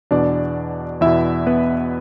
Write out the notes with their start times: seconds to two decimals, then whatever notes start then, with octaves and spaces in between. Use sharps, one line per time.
0.11 E2 B2 D4 D5
1.01 E2 B2 E4 E5
1.47 B3 B4